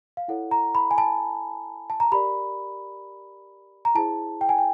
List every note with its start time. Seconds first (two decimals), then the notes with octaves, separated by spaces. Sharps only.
0.17 F5
0.28 E4 A4 C#5 F#5
0.51 A#5
0.75 B5
0.91 G#5
0.98 A5
1.90 A5
2.00 A#5
2.12 G4 A#4 D5 B5
3.85 A#5
3.95 E4 G#4 C5 A5
4.41 G5
4.49 G#5
4.58 G5